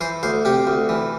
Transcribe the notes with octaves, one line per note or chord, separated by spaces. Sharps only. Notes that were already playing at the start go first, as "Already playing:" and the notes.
E3 C5
D2 C5
C3 G4
D2
E3